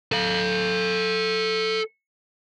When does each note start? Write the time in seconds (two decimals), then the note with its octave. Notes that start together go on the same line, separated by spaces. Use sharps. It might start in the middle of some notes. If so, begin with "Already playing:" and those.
0.12 A4 F5